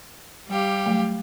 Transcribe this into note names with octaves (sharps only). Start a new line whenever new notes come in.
G3 G4 F5
F#3 A3